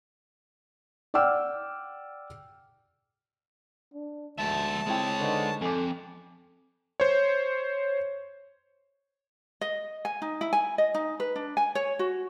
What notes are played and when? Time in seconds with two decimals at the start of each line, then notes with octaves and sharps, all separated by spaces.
1.14 D5 F#5 G5 D6 E6 F6
3.94 D4
4.39 D2 G#3 E5 A5
4.87 G#3 C4 E4 C#5 G5
5.20 D3 D#4 B4 C5
5.61 F2 A4 G#5 D6
7.00 C5 C#5
9.61 D#5
10.05 G#5
10.22 D#4
10.41 E4
10.53 G#5
10.78 D#5
10.94 D#4
11.20 B4
11.36 D4
11.57 G#5
11.75 C#5
11.99 F#4